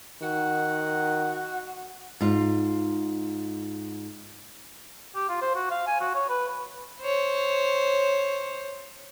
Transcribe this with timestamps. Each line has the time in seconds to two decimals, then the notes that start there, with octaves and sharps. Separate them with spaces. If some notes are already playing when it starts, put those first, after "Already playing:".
0.22 D#3 F#4 F#5
2.21 G#2 F4
5.15 G4
5.29 F4
5.42 C5
5.55 F#4
5.71 F5
5.87 G#5
6.00 F#4
6.15 C#5
6.29 B4
7.02 C5 C#5